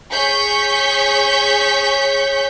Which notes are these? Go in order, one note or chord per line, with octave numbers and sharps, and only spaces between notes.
G#4 C#5 C#6 G6 B6